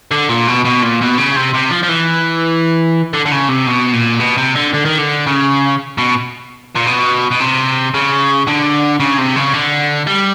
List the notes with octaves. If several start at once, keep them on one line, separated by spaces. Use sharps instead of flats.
D3
A#2
B2
B2
A#2
B2
C#3
C3
C3
F3
F3
E3
D3
D3
C#3
C3
B2
A#2
B2
C3
D3
D3
D#3
D3
C#3
B2
A#2
B2
B2
C3
C#3
D3
C#3
C3
C#3
D3
G3